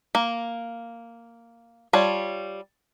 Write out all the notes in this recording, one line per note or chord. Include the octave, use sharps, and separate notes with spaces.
A#3
G3 F4 C#5 A5